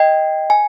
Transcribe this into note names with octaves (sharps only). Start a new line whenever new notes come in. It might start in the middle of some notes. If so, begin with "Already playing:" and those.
Already playing: D#5 G5
G#5